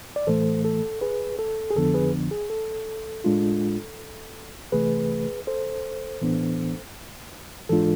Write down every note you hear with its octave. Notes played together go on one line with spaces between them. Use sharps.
D5
A2 E3 A3 A4 C5
A4
G#4 B4
A4
G#4
F2 D3 F3 B3 D4 A4
G#4 B4
G#4
A4
A2 G#3 D4 F4
C3 E3 A3 G#4 B4
A4 C5
A2 E3 B3 D4
G#2 E3 G#3 D4 F4 A4